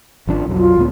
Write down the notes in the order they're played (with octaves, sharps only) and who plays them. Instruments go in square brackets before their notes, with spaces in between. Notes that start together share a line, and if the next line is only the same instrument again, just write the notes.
[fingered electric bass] G#1 F3 D4
B1 F2 F#3
[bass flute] F4
[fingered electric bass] C#2 A2 B3